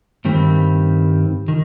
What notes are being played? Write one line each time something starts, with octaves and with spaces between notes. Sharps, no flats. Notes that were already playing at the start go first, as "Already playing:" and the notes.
G2 D#3 G3 C4
D#3